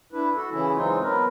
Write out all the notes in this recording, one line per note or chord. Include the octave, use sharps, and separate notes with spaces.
D4 E4 B4
F#4 A4
C#3 E3 C#4 E4
E3 F#3 G#3 C4 D#4 F4
F#3 B3 A#4 B4